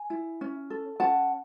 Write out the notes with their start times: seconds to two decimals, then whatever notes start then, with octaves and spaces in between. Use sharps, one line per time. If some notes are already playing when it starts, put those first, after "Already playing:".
Already playing: G#5
0.10 E4
0.41 C#4
0.70 A4
1.00 C#4 F#5 A5